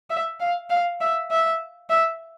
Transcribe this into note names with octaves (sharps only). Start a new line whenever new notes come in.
E5
F5
F5
E5
E5
E5